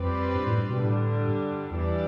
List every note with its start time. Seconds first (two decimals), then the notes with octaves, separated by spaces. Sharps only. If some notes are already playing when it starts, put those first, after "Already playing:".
Already playing: F2 G3 C4 G4 B4 D5
0.35 G2
0.47 A2
0.58 G2
0.70 B2
0.81 A2 D3 G3 D4
1.26 G2
1.71 E2 E3 G3 D4 G4 D5